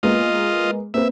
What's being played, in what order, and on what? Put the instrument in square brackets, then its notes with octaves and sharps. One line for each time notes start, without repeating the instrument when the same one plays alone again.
[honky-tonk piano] G#3 A#3 B3 [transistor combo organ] F4 D#5
[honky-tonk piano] A#3 C4 B4 [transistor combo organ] E5